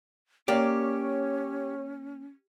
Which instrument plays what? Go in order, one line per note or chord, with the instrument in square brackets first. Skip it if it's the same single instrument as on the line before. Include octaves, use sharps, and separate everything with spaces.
[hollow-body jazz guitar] A#3 D5 [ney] C#4 [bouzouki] G4 [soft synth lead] C#5